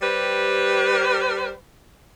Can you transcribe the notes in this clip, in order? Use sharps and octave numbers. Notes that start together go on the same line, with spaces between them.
G3 G4 B4 C5